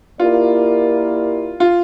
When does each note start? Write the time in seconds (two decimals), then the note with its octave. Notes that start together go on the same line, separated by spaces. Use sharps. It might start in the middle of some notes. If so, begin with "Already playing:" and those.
0.19 A#3 E4 F4 G4 A#4 D5
1.60 F4